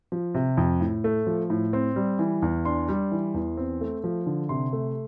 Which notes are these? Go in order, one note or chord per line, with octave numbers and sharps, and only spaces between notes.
F3
C3
F2
A2
A3
F3
A2
C4
G3
E3
E2
D4 C6
G3
E3
E2
C4
A3
F3
D3
C3 C6
A3